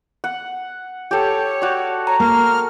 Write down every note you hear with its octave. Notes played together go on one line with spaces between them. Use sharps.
F#5
G4 A4 C#5
F#4 D5
C#5 A#5
A#3 F6